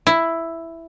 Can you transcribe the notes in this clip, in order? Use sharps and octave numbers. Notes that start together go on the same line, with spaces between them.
E4